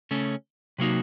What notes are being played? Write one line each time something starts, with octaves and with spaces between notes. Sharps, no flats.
C#3 A3 C#4
C3 F#3 A#3 D#4 F#4